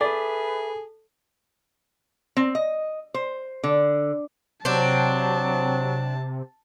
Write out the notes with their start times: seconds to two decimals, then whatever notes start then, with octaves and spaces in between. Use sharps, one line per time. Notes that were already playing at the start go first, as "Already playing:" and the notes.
0.01 G#4 A4 B4 D5 E5
2.37 C4
2.55 D#5
3.14 C5
3.64 D3
4.65 C3 F#3 C4 D4 A5